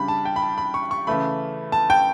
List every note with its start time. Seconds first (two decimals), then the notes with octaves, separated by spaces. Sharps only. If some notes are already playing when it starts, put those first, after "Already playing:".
Already playing: C#3 G3 D4 B5
0.08 A5
0.25 G5
0.36 B5
0.42 A5
0.58 B5
0.74 C#6
0.91 C#6
1.07 C#3 E3 A3 B5
1.72 A5
1.90 G5